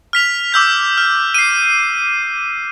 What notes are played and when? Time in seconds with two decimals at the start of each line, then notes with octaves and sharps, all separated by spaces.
0.13 F6 B6 F7
0.52 D6 E6 G6 B6
0.98 F6
1.34 C7 D#7